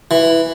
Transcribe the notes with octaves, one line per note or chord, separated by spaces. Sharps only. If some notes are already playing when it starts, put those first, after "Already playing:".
E3